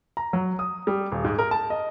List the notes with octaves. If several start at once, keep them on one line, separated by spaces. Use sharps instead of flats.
A#5
F#3
D#6
G3
D#1
G#2
A#4
A5
D#5